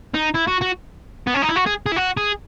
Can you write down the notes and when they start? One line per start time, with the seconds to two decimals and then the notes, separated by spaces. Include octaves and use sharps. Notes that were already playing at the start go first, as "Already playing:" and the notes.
0.14 D#4
0.34 E4
0.47 F#4
0.61 F#4
1.27 B3
1.34 C#4
1.42 D#4
1.49 E4
1.56 F#4
1.66 G#4
1.86 G#4
1.92 E4
1.96 F#4
2.17 G#4